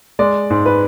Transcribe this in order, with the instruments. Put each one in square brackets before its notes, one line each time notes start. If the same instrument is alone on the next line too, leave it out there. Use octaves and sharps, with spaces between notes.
[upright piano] G#3 D5
G#2
B4